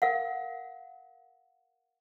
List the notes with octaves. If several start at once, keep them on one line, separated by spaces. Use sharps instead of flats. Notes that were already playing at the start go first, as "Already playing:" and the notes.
A#4 F5 F#5